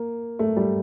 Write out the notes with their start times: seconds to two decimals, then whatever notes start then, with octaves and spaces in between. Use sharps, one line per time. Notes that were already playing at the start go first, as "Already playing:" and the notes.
Already playing: A#3
0.39 A3
0.56 G3